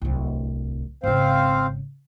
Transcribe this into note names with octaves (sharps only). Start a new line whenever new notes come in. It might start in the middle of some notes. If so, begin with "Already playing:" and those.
D1 C2
G#1 C#3 C4 C5 F5